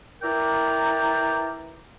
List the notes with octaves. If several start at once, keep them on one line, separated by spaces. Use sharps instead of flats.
E4 A#4 B4 D5 G5 A#5